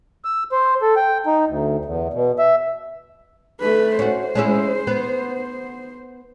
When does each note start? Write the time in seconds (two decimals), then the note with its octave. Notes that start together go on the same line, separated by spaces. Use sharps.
0.25 E6
0.52 C5
0.82 A4
0.96 G5
1.26 D#4
1.48 D2
1.85 E2
2.13 B2
2.39 E5
3.61 A3 B4
3.99 C#4 F#4 C5
4.35 G#3 C#4 E4
4.87 B3 B4